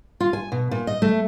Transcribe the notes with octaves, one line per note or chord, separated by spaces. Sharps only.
F4
G#5
B2
A#2
D#5
A3